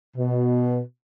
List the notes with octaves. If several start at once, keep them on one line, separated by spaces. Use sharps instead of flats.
B2